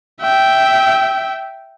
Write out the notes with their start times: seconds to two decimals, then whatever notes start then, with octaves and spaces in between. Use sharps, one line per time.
0.22 E5 G5